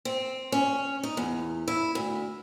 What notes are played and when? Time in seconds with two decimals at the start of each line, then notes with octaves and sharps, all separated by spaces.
0.05 C4
0.52 C#4
1.03 D#4
1.17 E2
1.68 E4
1.95 D2